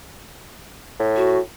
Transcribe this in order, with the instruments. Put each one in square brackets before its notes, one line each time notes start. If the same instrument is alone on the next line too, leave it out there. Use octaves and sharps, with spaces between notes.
[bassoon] A2
[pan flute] F#4